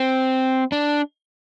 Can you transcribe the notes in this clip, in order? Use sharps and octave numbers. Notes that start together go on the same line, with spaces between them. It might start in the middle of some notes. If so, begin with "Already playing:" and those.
Already playing: C4
D4